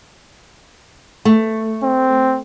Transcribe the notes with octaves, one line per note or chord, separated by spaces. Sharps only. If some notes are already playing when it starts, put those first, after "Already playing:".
A3
C4